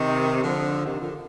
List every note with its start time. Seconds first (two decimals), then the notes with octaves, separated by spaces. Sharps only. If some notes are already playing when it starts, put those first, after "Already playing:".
Already playing: C3 D#3
0.43 D3 F3
0.85 C3 D#3
1.00 D3 F3